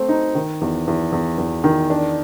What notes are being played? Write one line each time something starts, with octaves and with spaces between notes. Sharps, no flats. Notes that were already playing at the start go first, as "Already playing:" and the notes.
Already playing: A3 C4
D#4
D#3
E2
E2
E2
E2
D#3
D4